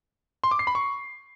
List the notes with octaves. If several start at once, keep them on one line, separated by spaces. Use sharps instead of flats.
C6
D6
C7
B5
C#6